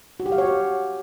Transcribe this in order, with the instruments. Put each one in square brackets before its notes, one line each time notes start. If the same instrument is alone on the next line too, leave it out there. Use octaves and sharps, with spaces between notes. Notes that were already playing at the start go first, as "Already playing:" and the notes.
[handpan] F#4
G4
F5
C#5
F#4